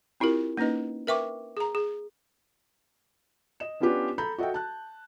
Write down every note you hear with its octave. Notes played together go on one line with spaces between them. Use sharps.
C4 E4 F4 G4 A#4
A#3 C#4 D#4 B4 D#5
A#4 B4 E5 G5 C#6 D6
G#4 A#5
G#4
D#5 E7
B3 C#4 D4 F4 G4 B4
A4 A#5 B5 G6
F#4 A4 D#5 E5 G5
A5 F#6